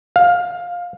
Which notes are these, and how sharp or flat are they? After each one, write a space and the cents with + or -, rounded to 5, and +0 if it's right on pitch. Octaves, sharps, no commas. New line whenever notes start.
F5 +15